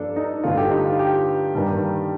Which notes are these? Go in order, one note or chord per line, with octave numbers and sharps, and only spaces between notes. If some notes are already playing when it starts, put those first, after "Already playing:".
Already playing: G2 F3 A#3 D4 A4
D#4
G2 D3 A3 F4
G4
D#4
F4
G4
G2 D#3 G3 A#3